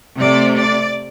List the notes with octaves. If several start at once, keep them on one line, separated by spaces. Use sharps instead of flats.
C3 A3 D5
D5